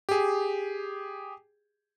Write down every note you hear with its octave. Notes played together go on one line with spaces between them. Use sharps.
G4 G#4